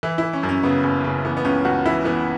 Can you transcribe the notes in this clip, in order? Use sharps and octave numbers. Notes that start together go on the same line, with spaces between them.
E3 E4
E3 E4
C#4
F#2
C#4
C#3 B3
F#1
C#3
E3 B3
B3
C#2 C#4
C#2 F#4
E3 E4
E3 B3